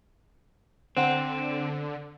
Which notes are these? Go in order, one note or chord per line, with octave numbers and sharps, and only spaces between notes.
D3 C4 C5 F#5 A5